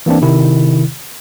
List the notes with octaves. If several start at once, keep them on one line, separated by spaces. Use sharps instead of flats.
E3 A#3 C4 D4
C3 D#3 E4